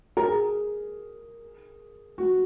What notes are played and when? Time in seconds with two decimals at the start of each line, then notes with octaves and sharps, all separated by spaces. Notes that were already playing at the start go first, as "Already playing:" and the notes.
0.17 A#4
0.28 G#4
2.18 F#4